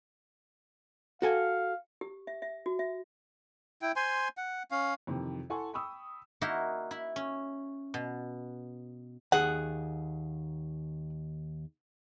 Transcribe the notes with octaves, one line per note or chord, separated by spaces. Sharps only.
F#4 A4 F5 G#5
G4
E5
E5
F#4
E5
E4 G5
C5 G#5 C6
F#5
C#4 F5
F2 C3 D#3 E3
E4 A4 F#5 G#5 C6 C#6
G5 B5 C#6 D#6 E6
A#3 D#4 E4 F#4
E4 B5
C#4
B2
D#2 G#4 F#5